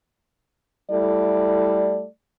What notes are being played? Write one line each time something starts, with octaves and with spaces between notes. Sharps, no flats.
G3 A3 E4 A4 D5